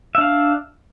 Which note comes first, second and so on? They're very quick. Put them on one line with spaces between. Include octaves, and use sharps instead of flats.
E5 D4 F5